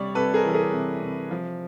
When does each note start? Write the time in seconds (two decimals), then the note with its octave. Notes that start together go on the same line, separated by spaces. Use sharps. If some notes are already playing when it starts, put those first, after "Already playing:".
Already playing: C3 G3 C#5 D5
0.15 C3 A4 B4
0.34 G#4 A#4
0.45 E3 A4
0.53 G#4 A#4
0.73 C3
1.02 C3
1.31 F3